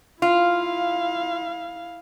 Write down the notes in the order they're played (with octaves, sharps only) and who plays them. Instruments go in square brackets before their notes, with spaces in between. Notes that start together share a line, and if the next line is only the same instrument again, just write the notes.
[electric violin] E4 F5 [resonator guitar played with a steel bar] F4